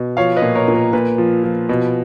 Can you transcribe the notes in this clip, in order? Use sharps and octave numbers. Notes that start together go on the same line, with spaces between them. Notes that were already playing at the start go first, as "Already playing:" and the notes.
Already playing: B2
F3 C#5 F5
B4 D#5
A#2
A#4 C#5
A#2
A#4
A#2 B4
F3
F3
B2